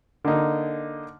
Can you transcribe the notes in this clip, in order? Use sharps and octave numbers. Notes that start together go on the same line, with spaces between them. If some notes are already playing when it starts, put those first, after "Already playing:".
D3 A#3 D#4